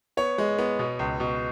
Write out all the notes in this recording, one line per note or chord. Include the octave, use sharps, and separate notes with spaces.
B3 C#5
G#3
B3
B2
C#2
B2